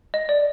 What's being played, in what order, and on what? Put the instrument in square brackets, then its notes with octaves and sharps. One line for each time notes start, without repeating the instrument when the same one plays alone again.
[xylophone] D#5
D5